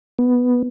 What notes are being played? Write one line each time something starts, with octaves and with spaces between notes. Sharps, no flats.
B3